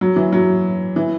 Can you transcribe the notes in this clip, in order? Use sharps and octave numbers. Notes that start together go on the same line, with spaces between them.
F#3
E3
F#3
E3